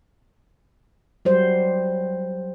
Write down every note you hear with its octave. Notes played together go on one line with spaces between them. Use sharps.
F#3 G3 C5